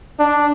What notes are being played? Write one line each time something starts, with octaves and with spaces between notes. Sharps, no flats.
D4